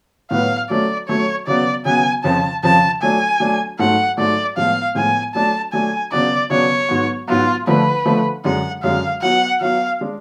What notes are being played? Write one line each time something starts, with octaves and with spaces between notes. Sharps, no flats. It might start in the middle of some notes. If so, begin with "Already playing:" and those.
A2 F#3 B3 F#4 B4 F5
F#3 A3 C#4 D5
F#3 A3 C#4 C#5
C#3 F#3 B3 D5
C#3 F#3 B3 G#5
F2 C#3 F3 A5
F2 C#3 F3 A5
F#3 A3 D4 G#5
F#3 A3 D4
G#2 F#3 A3 F#5
G#2 F#3 A3 D5
A2 F3 G#3 B3 F5
A2 F3 G#3 B3 G#5
F#3 A3 D4 A5
F#3 A3 D4 G#5
C#3 F#3 B3 D4 D5
C#3 F#3 B3 D4 C#5
G#2 F#3 B3
G#2 F#3 B3 F4
D3 F3 A3 B4
D3 F3 A3
F#2 D3 G#3 F#5
F#2 D3 G#3 F5
F#3 B3 F#4 F#5
F#3 B3 F#4 F5
G#3 D4